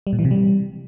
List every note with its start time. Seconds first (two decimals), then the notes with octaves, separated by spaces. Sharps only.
0.07 G3
0.13 A#2
0.19 E3
0.25 C3
0.31 G3